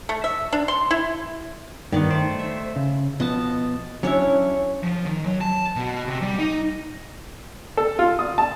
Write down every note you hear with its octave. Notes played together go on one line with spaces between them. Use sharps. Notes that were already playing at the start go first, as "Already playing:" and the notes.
A3
E5
D4
C6
E4
G2 D#3 B3 D5
A3 C5 D5
E5
C#3
B2 F3 B3 D#5 A5
F#3 C#4 D4 E4 C#5
F3
D#3
F#3
A5
B2
C3
G3
D#4
A4
F4
D#6
A5